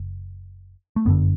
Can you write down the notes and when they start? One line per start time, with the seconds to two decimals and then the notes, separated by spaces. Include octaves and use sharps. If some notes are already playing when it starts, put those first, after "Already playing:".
Already playing: F#1
0.96 A3
1.05 G1 F#2 D3 B3